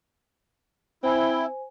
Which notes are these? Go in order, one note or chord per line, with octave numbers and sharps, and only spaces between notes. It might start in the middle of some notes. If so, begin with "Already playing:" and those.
C4 E4 C5 G#5